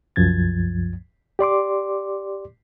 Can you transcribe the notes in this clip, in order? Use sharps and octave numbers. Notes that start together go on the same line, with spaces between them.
C2 F#2 F3 G#6 A6
G4 D5 C6 D6